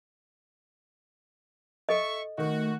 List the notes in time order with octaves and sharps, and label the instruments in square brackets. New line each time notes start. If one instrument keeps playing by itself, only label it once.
[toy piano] A4 D#5 [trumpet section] E5 C#6
[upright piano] D#3 [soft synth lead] A3 [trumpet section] F#4